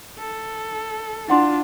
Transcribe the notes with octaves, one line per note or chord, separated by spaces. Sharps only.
A4
D4 E4 F4 F#5 C6